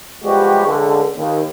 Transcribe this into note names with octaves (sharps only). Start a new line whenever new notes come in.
F3 G3 G#3 B3 F#4 G4
C#2 D3
D#2